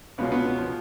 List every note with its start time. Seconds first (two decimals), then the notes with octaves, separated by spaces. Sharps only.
0.18 C#2 B2 G#3 B3 C#4 F4
0.32 B3
0.45 B3
0.59 F3